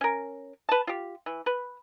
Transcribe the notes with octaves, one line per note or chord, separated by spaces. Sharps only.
C#4 A#4
B4 A5
F4 G4
E3
B4